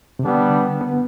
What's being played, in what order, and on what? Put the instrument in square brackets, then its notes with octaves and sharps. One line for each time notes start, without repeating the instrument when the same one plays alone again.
[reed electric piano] C3
[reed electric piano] D3 [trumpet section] G3 B3 D4
[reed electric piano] B3